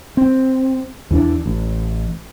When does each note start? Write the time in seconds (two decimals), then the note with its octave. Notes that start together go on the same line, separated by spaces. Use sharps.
0.17 C4
1.11 E2 E3 C#4 D4
1.46 A1